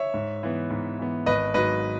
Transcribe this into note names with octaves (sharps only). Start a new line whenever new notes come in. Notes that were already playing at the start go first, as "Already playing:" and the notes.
Already playing: C#5 E5
G#2
E3 B3
G#2
E3 B3
G#1 B4 D#5
G#2 F#3 B4 D#5